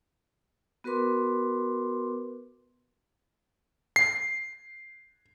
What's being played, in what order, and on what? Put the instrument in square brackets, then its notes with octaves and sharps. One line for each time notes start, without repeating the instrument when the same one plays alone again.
[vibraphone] B3 F#4 A#4 B4 C6 D6
[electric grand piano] C7